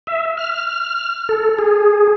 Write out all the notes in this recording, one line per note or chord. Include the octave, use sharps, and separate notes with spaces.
E5
F6
A4
G#4